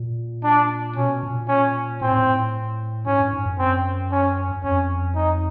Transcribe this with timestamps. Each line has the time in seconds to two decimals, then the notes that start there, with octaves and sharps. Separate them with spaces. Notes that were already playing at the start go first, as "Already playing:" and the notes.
Already playing: A#2
0.44 D4
0.96 B2 C#4
1.23 A#2
1.49 C#4
2.01 A2 C4
2.10 G#2
2.19 A2
3.07 G#2 C#4
3.20 G2
3.33 G#2
3.46 F#2
3.59 C4
4.12 C#4
4.52 F#2
4.64 F2 C#4
5.15 D#4